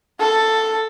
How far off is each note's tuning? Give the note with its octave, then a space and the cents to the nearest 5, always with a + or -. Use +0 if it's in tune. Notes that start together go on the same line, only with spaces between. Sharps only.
A4 +5